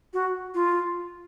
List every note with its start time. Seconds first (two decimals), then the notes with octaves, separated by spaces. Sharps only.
0.13 F#4
0.54 F4